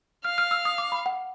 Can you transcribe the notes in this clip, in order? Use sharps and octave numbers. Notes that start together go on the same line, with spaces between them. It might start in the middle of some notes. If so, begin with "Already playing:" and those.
F5 F6
F6
E6
D#6
D6
B5
F#5